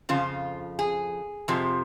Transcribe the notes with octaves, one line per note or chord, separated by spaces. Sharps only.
F2 C#3 F3 F4
G#4
F2 C3 F3